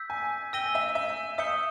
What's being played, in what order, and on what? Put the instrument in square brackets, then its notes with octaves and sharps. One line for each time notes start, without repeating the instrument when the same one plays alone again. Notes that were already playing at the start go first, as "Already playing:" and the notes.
Already playing: [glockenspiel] E6 G6 B6
[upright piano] G#5
[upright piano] G5 [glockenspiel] E6 A#6 D#7 G7
[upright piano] E5
E5
[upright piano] E5 [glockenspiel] D#6 G6 C#7 G7